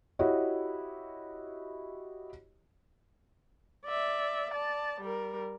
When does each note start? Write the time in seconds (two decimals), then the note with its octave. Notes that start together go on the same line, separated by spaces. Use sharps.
0.19 E4 F#4 G4 C#5 D#5
3.86 D5 E5
4.51 D5 A5
5.01 G3 A#4